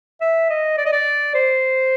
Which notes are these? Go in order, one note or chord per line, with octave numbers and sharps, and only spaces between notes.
E5
D#5
D5
D#5
D5
C5